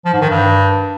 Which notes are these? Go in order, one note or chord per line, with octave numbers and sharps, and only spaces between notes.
F3
G#2
D#3
G2